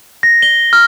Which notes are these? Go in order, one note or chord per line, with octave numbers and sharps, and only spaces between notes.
A#6
G7
F6